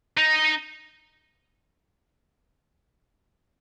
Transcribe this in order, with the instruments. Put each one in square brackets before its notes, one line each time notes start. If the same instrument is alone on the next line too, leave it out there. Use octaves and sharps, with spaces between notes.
[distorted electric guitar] D#4